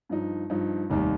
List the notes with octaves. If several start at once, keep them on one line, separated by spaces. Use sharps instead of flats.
G2 F3 D#4
G2 F3 D#4
F1 D#2 D#3 G3